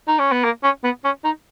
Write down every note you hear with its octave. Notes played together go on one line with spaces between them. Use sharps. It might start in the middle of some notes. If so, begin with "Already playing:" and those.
D#4
C#4
B3
A#3
C#4
B3
C#4
D#4